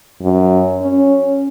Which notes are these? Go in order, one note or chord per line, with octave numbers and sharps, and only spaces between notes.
F#2
C#4